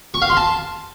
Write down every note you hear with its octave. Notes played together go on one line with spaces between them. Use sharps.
C#6
F5
C6
A5